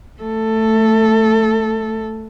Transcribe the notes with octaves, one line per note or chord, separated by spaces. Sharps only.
A3 A4